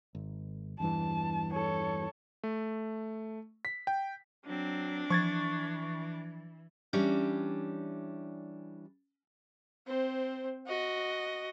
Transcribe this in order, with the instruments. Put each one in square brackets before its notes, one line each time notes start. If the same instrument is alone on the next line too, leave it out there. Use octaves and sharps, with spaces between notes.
[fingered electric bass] G#1
[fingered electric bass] E2 G2 E3 [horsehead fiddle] A5
[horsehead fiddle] A4 C#5
[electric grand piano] A3
B6
G5
[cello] F#3 C4 [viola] D4
[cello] E3 [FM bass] F3 [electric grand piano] C#6 G#6 A6
[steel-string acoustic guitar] E3 G3 C#4 D4
[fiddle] C4 C5
F#4 D#5